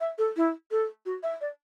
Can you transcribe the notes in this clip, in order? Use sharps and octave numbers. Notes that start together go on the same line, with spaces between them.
E5
A4
E4
A4
F#4
E5
D5